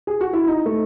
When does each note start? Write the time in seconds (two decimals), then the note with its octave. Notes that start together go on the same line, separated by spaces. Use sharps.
0.07 G#4
0.21 F#4
0.33 E4
0.47 D#4
0.66 A3